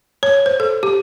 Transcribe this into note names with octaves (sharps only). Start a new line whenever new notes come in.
C#5
C5
A4
G4